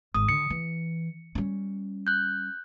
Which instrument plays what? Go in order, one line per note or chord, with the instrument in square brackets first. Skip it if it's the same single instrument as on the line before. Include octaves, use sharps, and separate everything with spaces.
[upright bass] G#1 [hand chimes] D#6
[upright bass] D3 [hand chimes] C#7
[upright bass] E3
G3 C#4
[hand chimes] F#6 G6